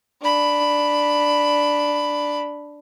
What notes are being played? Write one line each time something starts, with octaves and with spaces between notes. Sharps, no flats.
D4 B5